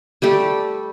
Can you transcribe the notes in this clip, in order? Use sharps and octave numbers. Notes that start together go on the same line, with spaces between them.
G3 A3 G4 A4